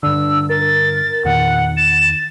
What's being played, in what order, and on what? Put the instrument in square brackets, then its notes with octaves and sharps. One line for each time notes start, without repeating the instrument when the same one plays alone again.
[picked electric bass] G2 D3 [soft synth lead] D4 [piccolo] E6
[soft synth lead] A#4 [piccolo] A6
[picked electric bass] E2 D#3 [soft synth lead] A#2 [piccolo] F#5
[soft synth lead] A6 [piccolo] E7